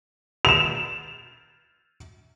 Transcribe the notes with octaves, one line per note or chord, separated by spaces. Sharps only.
E7 F7